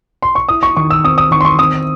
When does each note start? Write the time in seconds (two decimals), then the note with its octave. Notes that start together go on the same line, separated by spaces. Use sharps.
0.22 C6
0.35 C#6
0.49 E4 D#6
0.63 C#6
0.76 D#3 C#6
0.90 E6
1.04 C4 D#6
1.18 D#6
1.31 D#3 C#6
1.41 C6
1.45 C#6
1.59 C4 D#6